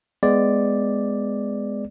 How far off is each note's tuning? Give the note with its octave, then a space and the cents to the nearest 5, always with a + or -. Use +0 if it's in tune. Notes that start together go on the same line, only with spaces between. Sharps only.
G#3 +0 B3 +20 D5 +0